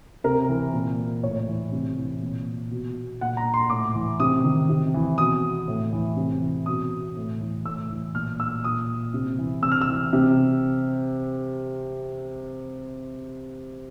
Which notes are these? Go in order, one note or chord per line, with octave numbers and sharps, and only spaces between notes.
C3 A#4
E3
A#2
A2 C#5
E3
C3
E3
A#2
B2
A#2 F#5
A#5
C6
A2 D6
E3
C3 D#6
D#3
C3
E3
B2 D#6
A2
E3
C3
E3
B2 D#6
A2
E3
A2 E6
E3
A#2 F6
E6
A#2 D#6
C3
E3
C3 E6
F6
E6
E3
C3